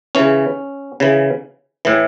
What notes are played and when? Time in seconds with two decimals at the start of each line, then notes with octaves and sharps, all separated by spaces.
0.15 C#3 E3 C#4
1.00 C#3 E3
1.85 A2 E3